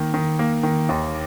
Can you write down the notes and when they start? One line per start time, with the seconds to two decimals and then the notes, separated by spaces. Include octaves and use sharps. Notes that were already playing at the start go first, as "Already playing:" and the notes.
Already playing: D#3 A#3
0.14 D#3
0.39 A#3
0.63 D#3
0.89 D#2